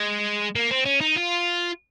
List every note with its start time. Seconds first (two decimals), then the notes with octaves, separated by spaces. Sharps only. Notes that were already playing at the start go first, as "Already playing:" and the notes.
Already playing: G#3
0.56 A#3
0.71 C4
0.86 C#4
1.01 D#4
1.16 F4